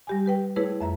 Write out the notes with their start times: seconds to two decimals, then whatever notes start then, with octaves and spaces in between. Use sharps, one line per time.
0.07 G3 G4 G#5
0.26 G4 B4 G5
0.56 A3 E4 G#4 B4 C#5
0.81 F2 E5 A#5